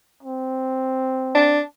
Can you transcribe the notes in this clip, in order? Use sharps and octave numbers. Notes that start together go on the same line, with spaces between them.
C4
D4